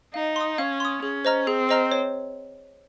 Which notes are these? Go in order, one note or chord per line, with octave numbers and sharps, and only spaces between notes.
D#4 F5
C6 D#6
C#4 F5
C6 D#6
C#4 G#4
C5 D#5 A#5 F6
C4 G#4
C5 D#5 A#5 F6
C#5